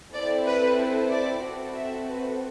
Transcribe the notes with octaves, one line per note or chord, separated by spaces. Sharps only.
C4 E4 A4 D5
B4
D5
C4 F#4 A4
E5
B4